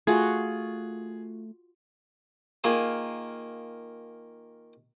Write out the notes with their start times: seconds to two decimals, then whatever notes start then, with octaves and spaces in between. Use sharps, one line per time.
0.07 A3 F4 F#4 G#4
2.64 D#3 A#3 F4 G#4